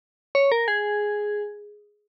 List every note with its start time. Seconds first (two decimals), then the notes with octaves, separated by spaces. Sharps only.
0.35 C#5
0.52 A#4
0.68 G#4